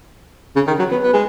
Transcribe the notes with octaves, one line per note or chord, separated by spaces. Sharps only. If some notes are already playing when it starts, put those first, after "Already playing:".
C#3
D#3
F#3
B3
B3
G#3